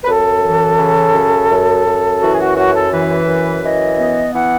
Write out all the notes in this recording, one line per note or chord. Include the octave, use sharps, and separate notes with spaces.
B4
F#2 A4
E3
C#3
F#2
F#2
F#2
E3 F#4
G#4
F#4
F#2 F#4
A4
E3 B4
F#2
E3 D#5
B3
E3 F#5